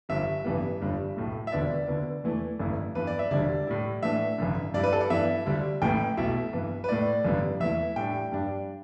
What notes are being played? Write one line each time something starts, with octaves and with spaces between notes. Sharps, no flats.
G1 G2 G3 E5
A1 G2 E3 G3 B3
G1 G2 G3 D4
B1 A2 A3
E5
E1 D2 D3 B3 D5
D2 D3 B3
E2 E3 A3 E4
A1 G2 D3 A3 E4
G2 E3 B3 B4
D5
E5
E1 D2 D3 G3 D4 D5
A2 G3 E4
A2 E3 A3 D4 E5
A1 G2 D3
G2 G3 E4 D5
B4
A4
D5
G2 E3 B3 E4 E5
D2 D3 G3 D4
A1 A2 E3 A3 E4 G5
B1 B2 A3 E4 E5
G2 E3 B3
B4
A2 A3 E4 D5
A1 G2 D3 G3 B3
E2 E3 A3 E4 E5
A2 G3 D4 G5
G2 G3 D4